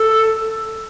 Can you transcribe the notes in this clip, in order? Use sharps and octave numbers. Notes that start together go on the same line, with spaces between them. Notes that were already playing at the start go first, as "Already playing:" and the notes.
Already playing: A4